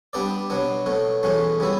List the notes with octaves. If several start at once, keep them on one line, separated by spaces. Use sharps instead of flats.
G3 B3 D4 G4 D5
B2 F#3 B3 D4
B2 F#3 A3
E2 B2 F#3 A3 C#4
C#3 G3 B3 E4